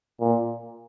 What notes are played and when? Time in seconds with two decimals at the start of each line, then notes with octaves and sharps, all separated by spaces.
0.20 A#2